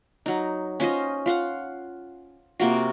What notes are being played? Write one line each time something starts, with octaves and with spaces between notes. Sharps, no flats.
F#3 D#4
C#4 F4 C5 D#5
F4 F5 F#5
C3 A#3 F4 F#4